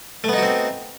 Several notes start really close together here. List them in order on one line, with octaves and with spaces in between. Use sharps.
A3 B3 D#4 F#4 C4